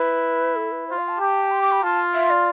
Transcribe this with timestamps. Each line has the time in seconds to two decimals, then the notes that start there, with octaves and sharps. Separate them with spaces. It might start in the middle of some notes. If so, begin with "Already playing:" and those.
Already playing: E4 B4
0.56 A4
0.72 B4
0.87 F4 C5
0.99 F5
1.09 A5
1.19 G4
1.51 C6
1.62 D6
1.72 B5
1.82 F4 A5
2.14 E5
2.30 D5